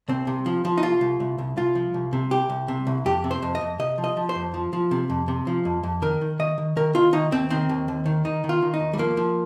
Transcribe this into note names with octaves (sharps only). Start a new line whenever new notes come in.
C2 C4
C3
F3
F3
D#4
C2 F4
C2
C2
C2
C2 F4
F3
C2
C3
C2 G4
C2
C3
C2
F2 G4
C3
C5
F2
D#5
F2
C3 D#5
F3
D#5
F3
C5
F2
F3
F3
C3
F2
C3
F3
F2
F2
D#3 A#4
D#3
D#3 D#5
D#3
D#3 A#4
D#3 F4
D#3 D#4
D#2 C4
D#3 C4
D#2
D#2
D#3
D#3 D#4
D#3
F4
D#3
D#4
D#2
G3
F3 A#3
F3